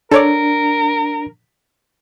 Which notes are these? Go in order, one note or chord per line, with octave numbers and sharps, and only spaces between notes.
D4 A4 A#4 C#5 D5